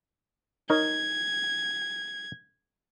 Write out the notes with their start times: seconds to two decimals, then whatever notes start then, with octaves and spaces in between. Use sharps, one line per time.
0.70 D#4 A#4 C#5 G#6